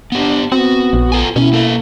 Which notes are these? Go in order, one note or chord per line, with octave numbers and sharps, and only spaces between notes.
B3 D4 G4
B3 C4 F#4
A#1
F4 A4 G#5
B2 C#4 E4
A#3 A4